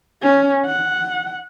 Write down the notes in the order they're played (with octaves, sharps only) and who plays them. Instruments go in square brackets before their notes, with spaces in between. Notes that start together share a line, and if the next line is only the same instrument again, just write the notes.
[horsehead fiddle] C#4
F#5